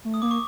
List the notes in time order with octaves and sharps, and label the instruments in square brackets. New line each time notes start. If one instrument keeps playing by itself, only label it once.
[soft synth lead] A3
[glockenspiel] D#6
[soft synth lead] A#3 [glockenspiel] D6
[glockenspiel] C#6